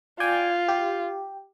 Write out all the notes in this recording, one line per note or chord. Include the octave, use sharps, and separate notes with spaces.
F4 D5 G5 G#5
G4